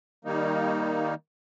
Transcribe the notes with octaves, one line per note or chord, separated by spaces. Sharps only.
D#3 G3 A#3 D#4